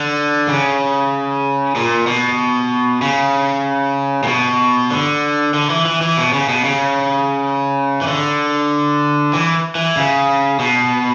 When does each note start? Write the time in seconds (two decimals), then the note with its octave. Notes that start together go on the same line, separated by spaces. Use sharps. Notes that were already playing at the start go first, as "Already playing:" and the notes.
Already playing: D3
0.48 C#3
1.75 A#2
2.07 B2
3.02 C#3
4.23 A#2
4.28 B2
4.90 D3
5.54 D3
5.70 E3
5.85 E3
6.01 E3
6.17 B2
6.33 C#3
6.49 B2
6.64 C#3
8.01 E3
8.07 D3
9.33 E3
9.75 E3
9.96 C#3
10.59 B2